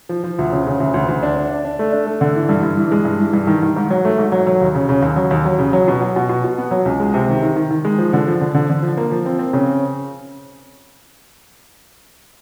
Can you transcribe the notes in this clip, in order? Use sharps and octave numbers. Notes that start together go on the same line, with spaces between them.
F3
F3
D2
C#3
C#3
D2
D2
D2
D4
D4
D4
D4
A3
D4
A3
D3
E3
G2
G2
E3
G#3
G2
E3
G2
D#3
D#3
G#2
F#3
A3
G#2
F#3
F#3
D#2
C#3
C#3
D#2
F#3
D#2
F#3
C#3
F#3
B2
F#3
B2
B2
B2
B3
F#3
C#2
G#3
C3
D#3
D#3
D#3
D#3
G#3
F3
D3
F3
D3
D3
D3
F3
A#3
F3
C4
C4
C#3